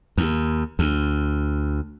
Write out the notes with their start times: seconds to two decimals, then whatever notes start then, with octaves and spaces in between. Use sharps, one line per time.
0.18 D#2
0.79 D2